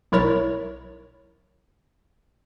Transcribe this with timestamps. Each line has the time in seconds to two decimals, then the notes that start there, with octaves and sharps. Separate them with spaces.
0.12 B1 E4 A#4 C#5 A6